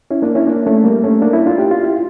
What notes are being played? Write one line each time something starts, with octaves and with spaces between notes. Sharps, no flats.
C#4 E4
A#3 D4
C#4 E4
A#3 D4
A3 C#4
G3 A#3
A3 C#4
A#3 D4
C#4 E4
D4 F4
G4
F4
E4